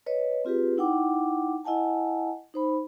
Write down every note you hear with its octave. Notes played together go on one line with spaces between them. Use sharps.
B4 C#5 D#5
C4 F4 G4 G#4 B4
D#4 E4 F#5 G5 D6
E4 D#5 F#5 G#5 A5
D#4 C5 B5